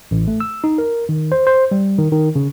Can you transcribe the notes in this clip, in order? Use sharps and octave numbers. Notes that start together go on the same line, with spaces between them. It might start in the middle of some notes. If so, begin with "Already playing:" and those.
A1
A3
E6
D#4
A#4
D#3
C5
C5
G3
D#3
D#3
C#3